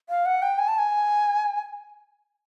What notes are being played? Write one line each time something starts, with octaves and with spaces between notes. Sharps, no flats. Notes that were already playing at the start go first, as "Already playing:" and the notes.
F5
F#5
G5
G#5
A5
G#5